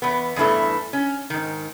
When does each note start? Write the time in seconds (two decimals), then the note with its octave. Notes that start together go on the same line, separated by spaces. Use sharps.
0.02 E2 B3
0.36 E2 G2 E3 A3
0.93 C#4
1.30 G#2 D#3